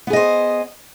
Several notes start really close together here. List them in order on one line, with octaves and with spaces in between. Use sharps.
B3 G#4 D#5 C5